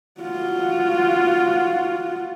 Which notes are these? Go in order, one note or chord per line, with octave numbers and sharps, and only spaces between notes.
F4 F#4